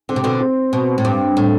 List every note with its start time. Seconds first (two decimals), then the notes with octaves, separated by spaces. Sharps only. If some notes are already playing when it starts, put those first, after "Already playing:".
0.09 D3 C4
0.16 C3
0.24 B2 D3
0.40 C4
0.73 B2
0.98 A2
1.05 G2
1.37 A2